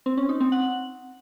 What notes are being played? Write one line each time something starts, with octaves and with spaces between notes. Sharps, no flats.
C4
C#4
D#4
C4
F#5